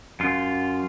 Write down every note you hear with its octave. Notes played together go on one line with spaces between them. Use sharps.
F#2 F4